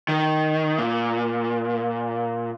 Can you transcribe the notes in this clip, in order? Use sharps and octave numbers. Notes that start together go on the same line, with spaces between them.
D#3
A#2